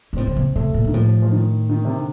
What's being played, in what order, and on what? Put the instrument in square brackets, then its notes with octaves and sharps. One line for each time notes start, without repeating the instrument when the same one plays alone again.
[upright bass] A#2
[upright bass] A2 [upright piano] C4
[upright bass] D3
C3
[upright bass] C3 [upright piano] A3
[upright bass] A#2
[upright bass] A#2 [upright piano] D#3
[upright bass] A2 [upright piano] F3
[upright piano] F3
D#3
D#3
C3
D3